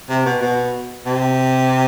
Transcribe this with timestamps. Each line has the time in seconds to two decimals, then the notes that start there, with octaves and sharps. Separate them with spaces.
0.09 C3
0.26 B2
0.42 B2
1.06 C3